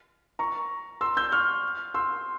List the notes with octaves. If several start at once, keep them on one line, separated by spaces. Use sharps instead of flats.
A#5 C#6
C6 E6
E6 G6
C#6 F6
C6 E6